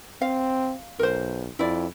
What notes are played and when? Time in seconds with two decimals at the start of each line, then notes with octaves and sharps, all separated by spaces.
0.21 C4 F5
0.99 B1 A#4 C5
1.59 F2 E4 D5